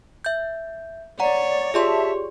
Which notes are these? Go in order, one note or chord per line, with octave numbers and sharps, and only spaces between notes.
E5 G6
C#5 D5 F#5 A#5
F4 G4 G#4 D5 E5 A5 C6